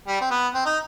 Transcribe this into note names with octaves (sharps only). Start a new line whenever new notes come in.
G3
C4
B3
C4
D#4